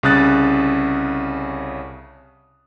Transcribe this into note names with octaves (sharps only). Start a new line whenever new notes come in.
C2 C#3 C#4 D#6 F#6 A6